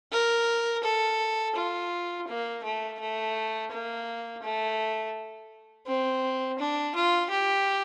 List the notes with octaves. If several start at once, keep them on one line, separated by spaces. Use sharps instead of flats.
A#4
A4
F4
A#3
A3
A3
A#3
A3
C4
D4
F4
G4